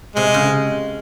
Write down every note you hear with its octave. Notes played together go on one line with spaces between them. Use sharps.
C3 G#3
C#3